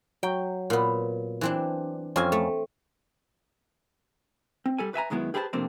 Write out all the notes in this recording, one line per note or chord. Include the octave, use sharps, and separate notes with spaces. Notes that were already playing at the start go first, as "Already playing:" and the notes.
F#3 G5
A#2 B3
E3 C4 D4
F2 C4 C#4 F5 G#5
A3
C4
G3 A4 G#5
B4 E5 G#5 A#5
F#2 D#3 G#3 B3 E4
G4 G#4 B4 C5 G5 A5
F2 C3 A3 A#3 C4 D4